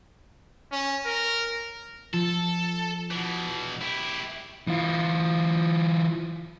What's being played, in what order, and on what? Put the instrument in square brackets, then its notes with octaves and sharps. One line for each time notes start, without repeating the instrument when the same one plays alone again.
[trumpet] C#4
A#4
[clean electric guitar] F3 [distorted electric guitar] A4
[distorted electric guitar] B2 E3
E4 G4
[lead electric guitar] E3 F4